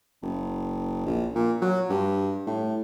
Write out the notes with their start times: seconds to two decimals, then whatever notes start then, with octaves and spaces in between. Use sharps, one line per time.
0.23 F#1
1.06 A#1
1.35 A#2
1.61 F#3
1.90 G2
2.47 A2